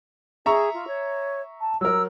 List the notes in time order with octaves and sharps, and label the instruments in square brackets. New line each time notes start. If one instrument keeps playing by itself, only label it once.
[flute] G#4 [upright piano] E5 A#5 C#6
[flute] F4
C#5
A5
[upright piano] F#3 A#4 [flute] E6